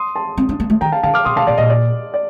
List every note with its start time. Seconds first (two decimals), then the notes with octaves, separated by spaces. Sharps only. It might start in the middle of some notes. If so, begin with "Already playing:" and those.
Already playing: C6 D#6
0.16 A5 C6
0.37 C4
0.49 D4
0.60 A#3
0.70 A3
0.81 D#3 G5 A#5
0.92 F5 A5
1.03 D3 F5 A5
1.14 D6 F6
1.25 C3 C6 D#6
1.36 C3 F5 A5
1.47 A#2 D5
1.58 A#2 D#5
1.70 D5
2.14 D5